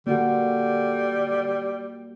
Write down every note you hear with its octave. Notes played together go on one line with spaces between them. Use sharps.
D3 G3 A#3 F#4